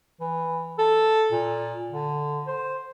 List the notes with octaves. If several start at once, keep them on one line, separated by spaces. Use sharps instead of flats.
E3
A4
A#2
D3
C5